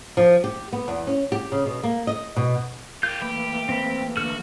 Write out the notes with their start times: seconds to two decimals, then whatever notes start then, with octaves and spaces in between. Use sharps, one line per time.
0.17 F3
0.44 G4
0.73 B3
0.88 E2
1.07 C#4
1.32 G4
1.52 C#3
1.66 B2
1.83 A#3
2.07 D#5
2.36 B2
3.03 F4 G4 A#4 G6
3.21 E3 A3 A#3 G4 B5
3.69 C4 B5
4.17 D3 F#4 A4 F6